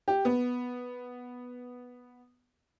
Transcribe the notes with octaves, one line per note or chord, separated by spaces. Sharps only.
G4
B3